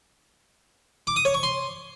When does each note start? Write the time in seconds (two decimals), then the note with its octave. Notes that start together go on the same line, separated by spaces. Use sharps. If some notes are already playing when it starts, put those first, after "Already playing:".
1.07 D6
1.16 D#6
1.25 C#5
1.34 C#6
1.43 C6